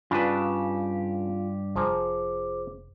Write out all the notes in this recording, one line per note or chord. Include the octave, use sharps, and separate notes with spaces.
G2 C#3 D4 F4 G4 B4 A5
F1 F3 G#4 C5 G#5 A#5 D6